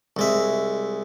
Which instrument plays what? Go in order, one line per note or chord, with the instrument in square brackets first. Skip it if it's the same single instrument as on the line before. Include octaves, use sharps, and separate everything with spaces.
[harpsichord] C2 G#3 E5